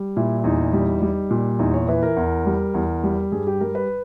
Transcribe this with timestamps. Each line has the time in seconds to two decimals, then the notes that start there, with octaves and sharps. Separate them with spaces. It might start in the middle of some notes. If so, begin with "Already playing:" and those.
Already playing: G3
0.16 A#2 E4
0.39 E4
0.44 E2 D#4
0.73 G3
1.02 G3
1.30 A#2
1.59 E2 D#4
1.74 C#5
1.88 E3 B4
2.03 A#4
2.17 E2
2.46 G3
2.74 E2
3.04 G3
3.32 G2 G#4
3.47 G4
3.61 G3 A#4
3.75 B4